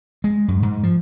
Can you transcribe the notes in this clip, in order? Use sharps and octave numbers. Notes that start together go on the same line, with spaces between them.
G#3
F#2
G#2
F3